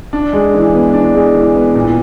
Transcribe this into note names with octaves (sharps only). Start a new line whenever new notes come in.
D4
G#3
E3
B3
D4
G#3
E3
B3
A#2